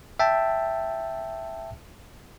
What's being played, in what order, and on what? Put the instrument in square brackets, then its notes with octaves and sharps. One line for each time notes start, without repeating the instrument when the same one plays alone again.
[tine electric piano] E5 G5 A5